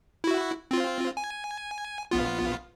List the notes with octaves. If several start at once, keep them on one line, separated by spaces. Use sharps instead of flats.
E4 F#4
C4 F4
G#5
A#1 B3 F4